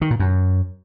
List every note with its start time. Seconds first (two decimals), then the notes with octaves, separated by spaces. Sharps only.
0.02 D#3
0.11 A#2
0.20 F#2